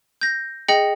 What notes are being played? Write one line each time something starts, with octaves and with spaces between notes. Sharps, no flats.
G6 A#6
G#4 D#5 G5 A#6 C#7 F#7